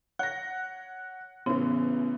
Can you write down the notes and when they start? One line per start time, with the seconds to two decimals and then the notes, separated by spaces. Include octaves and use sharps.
0.19 C#5 F#5 F#6 A#6
1.46 A1 C#3 E3 B3